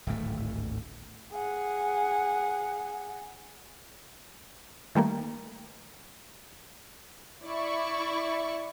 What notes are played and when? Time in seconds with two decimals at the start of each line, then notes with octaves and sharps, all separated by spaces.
0.07 D1 G#1 A3
1.32 G#4 F#5
4.95 D#3 G3 A3 A#3
7.45 E4 D5 C#6